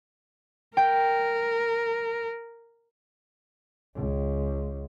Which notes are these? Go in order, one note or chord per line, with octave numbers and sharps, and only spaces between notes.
A#4 G5
C#2